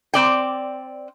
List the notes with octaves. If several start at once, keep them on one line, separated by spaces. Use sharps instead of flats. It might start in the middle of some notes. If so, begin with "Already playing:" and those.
C4 D5 G5